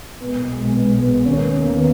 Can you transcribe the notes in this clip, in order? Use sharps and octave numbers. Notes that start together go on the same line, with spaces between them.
B1 A#2 G#3 B3
B3
B3
D#2 D#3 A#3 C#4
B3
B3